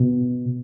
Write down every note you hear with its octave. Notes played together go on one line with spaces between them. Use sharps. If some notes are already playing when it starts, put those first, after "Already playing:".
Already playing: B2